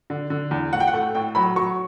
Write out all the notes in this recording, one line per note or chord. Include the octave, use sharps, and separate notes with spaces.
D3
D3
E2
A2 F#5
G5
F#5
A3
A2 G5
F#3 B5
F#3 C#6